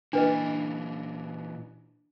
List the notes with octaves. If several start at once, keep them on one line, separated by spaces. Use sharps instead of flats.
A#2 E3 D4 B4 D#5